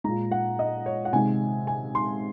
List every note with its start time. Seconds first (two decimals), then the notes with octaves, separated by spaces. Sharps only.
0.04 A#2 G#3 A#5
0.31 F#5
0.59 D#5
0.86 C#5
1.05 F#5
1.13 C3 D#3 G#3 G#5
1.67 G#5
1.95 C6